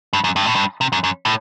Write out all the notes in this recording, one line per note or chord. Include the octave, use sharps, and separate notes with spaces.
G2
F#2
G2
A2
G2
C3
F#2
F#2
A2